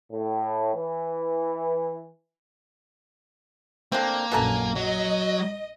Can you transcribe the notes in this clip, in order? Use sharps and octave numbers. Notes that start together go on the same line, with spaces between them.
A2
E3
D3 A#3 C4
A#1 F#2 B2 A4 G#5 A#5
F#3 D#5